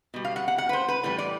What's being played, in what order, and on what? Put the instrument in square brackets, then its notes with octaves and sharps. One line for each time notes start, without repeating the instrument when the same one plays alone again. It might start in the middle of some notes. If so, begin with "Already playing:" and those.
[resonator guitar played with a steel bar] B2 G3
F5
F#5
F#5
F#5
B4
C5
B4
A2 E3 G3 B4
D5